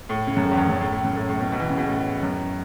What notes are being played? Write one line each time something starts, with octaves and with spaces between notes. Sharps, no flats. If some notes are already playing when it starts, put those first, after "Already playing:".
A2
C#3
F#2
A2
E2
F#2
F#2
A2
A2
F#2
A2
A2
B2
B2
E3
C#3
B2
A2
F#2